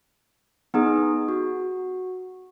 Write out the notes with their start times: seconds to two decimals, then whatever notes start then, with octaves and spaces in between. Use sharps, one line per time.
0.74 B3 D#4 G#4
1.28 F#4